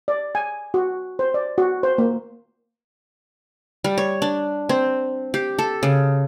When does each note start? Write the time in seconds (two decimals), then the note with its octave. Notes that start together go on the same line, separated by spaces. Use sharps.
0.08 D5
0.35 G#5
0.74 F#4
1.19 C5
1.34 D5
1.58 F#4
1.83 C5
1.98 A#3
3.84 G3
3.98 C#5
4.22 D4
4.69 C4
5.34 G4
5.59 A4
5.83 C#3